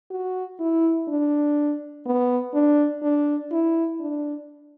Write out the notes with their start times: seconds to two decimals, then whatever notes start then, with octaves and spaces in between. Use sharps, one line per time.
0.10 F#4
0.59 E4
1.08 D4
2.06 B3
2.54 D4
3.02 D4
3.51 E4
4.00 D4